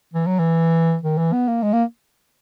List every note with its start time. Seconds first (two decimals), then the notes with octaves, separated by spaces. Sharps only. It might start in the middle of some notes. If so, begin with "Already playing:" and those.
0.14 E3
0.27 F#3
0.39 E3
1.03 D#3
1.18 E3
1.33 B3
1.48 A#3
1.63 G#3
1.73 A#3